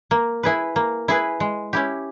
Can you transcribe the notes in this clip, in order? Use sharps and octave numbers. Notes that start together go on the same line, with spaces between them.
A#3
E4 G#4 B4
A#3
E4 G#4 B4
G#3
C#4 E4 G4